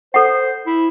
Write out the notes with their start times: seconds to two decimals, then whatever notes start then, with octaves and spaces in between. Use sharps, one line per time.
0.14 A4 C5 F#5
0.67 E4